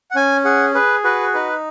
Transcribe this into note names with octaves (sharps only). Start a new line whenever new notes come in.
F#5
C#4 G#5
G#4 F#5
G#4 B4
F#4 B4
D#4 B4